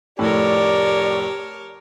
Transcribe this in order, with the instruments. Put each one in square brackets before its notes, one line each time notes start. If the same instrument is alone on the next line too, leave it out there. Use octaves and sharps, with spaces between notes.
[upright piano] F1 A2 [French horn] G4 [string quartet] A#4 C#5 A5 [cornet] D5